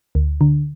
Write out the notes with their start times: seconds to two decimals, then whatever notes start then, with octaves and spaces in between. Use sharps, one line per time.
0.15 D2
0.41 D3